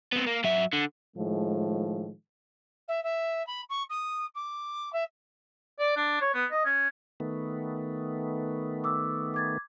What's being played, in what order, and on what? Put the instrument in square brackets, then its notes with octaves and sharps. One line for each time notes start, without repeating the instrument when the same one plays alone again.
[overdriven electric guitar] B3 C4
A#3
F#3 E5
D3
[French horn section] A2 D#3 F3 G#3
[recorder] E5
E5
B5
C#6
D#6
D6
E5
[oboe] D5
D4
C#5
B3
D#5
C#4
[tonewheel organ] D#3 A3 B3
[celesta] D6 E6
D6 G#6 A6